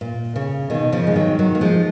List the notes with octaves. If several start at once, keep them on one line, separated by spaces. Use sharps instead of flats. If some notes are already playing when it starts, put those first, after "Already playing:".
A#2
C#3
B2 D#3
C#3 F3
G#3
D#3 F#3
D#3 F#3
A#3
F3 G#3